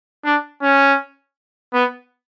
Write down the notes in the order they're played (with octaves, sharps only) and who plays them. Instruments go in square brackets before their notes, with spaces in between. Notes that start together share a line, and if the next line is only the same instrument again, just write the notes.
[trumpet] D4
C#4
B3